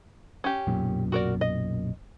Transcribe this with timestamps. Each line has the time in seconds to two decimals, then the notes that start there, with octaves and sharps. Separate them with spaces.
0.44 C#4 G4
0.67 B1 F#2 A#2
1.12 F#4 A#4 D5
1.41 D#5